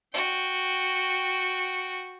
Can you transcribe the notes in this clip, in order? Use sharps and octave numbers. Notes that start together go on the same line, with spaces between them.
F#4 G5